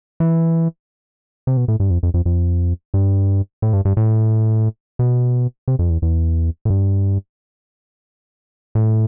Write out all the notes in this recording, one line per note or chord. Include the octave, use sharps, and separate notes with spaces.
E3
C3
B2
A2
G2
F2
F2
F2
F2
G2
A2
G2
G2
A2
B2
C3
F2
E2
E2
A2
G2
A2